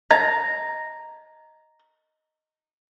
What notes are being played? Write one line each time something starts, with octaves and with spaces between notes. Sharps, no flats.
D#5 A#5